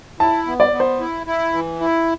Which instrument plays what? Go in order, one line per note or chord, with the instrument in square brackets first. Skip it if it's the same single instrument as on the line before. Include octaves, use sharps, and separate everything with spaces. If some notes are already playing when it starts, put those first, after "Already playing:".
[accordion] E4 [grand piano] A5
[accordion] B3
[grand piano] D5
[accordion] B3
[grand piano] C5
[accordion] E4
E4
E3
E4